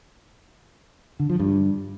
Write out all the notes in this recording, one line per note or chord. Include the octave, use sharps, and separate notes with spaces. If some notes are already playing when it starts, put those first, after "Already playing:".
D3
F3
G2